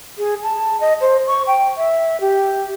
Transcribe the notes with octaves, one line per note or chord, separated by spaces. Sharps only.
G#4
A5
D#5
C5
C#6
G5
E5
G4